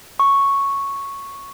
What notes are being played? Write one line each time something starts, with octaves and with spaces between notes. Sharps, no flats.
C#6